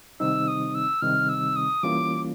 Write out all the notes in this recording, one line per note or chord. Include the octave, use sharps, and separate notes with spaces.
C3 D#3 G3 C4 D#4 E6
D#6
E6
C3 D#3 G3 C4 D#4 F6
E6
D#6
E3 G3 A#3 C#4 F4 D6